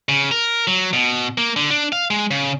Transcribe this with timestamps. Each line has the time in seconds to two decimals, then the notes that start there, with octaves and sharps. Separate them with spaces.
0.09 C#3
0.31 A#4
0.67 F#3
0.93 B2
1.38 A#3
1.56 D3
1.70 D4
1.92 F5
2.10 G#3
2.31 C#3